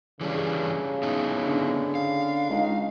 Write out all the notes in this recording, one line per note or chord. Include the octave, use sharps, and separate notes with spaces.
C#3 E3 G3 D4
B3 D#4 E4
D3
F5
C#2 D#4